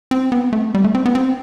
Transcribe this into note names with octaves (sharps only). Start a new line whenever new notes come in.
C4
B3
A3
G3
A3
C4
B3
C4